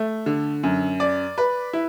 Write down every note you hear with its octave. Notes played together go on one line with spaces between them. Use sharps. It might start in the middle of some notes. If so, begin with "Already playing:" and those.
Already playing: A3
D3
F#2
D5
B4
E4